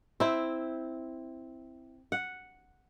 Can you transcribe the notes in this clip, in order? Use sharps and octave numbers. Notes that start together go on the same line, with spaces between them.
C4 E4
F#5